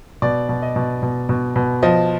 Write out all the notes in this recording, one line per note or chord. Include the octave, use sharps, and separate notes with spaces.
B2 D5
B2
D#5
B2
B2
B2
B2
F3 D#5